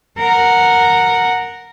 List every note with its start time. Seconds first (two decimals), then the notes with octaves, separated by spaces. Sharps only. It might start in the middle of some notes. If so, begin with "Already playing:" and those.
0.19 A#4 F#5